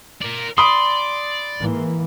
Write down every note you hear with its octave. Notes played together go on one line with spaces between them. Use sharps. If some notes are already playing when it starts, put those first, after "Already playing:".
A#4 D5
D5 B5 C6 D#6
G#2 E3 A#3